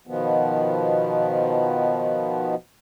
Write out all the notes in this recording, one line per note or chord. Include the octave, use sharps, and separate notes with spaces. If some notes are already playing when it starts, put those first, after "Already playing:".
B2 D#3 F3 B3